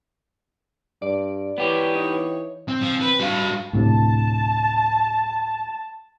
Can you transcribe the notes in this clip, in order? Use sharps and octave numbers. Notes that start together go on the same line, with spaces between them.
G2 D5
E3 B3 G4 C#5
D#4
C4
F3
B4
G2 F#4 F5
D2 A2 C3 A5